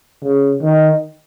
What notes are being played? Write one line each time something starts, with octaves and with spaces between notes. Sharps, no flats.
C#3
D#3